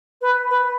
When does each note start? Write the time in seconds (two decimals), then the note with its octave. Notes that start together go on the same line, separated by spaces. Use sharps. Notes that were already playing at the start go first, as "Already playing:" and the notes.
0.21 B4
0.50 B4